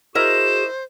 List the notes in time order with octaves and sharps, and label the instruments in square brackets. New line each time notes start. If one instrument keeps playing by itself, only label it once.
[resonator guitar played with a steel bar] E4 A#4 D#5 [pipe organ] F#4 G#4 [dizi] C5 [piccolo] E7